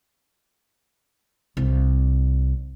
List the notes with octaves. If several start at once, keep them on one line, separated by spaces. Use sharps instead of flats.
C2